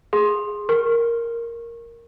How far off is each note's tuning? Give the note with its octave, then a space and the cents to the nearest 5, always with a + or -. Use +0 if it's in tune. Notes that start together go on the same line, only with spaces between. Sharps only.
G#4 +0 C6 +15
A#4 +0 C#6 -30